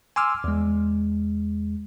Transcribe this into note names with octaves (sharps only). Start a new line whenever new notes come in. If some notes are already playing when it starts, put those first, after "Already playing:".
G#5 C6 D6 E6 F6
E2 G#3